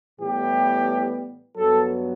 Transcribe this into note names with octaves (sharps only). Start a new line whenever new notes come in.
A2 E3 G3 B3 G4
G2 F#3 B3 A4